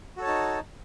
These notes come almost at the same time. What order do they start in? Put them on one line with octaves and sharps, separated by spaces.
F#4 A4 C#5 A5 D#4